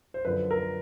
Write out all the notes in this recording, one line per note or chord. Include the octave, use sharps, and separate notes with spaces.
C5
F#2 D3 F3 B4
A#4